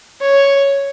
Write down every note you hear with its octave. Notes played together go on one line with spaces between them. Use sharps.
C#5